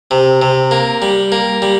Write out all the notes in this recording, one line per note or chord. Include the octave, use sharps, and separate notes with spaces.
C3
C3
A#3
G3
A#3
G3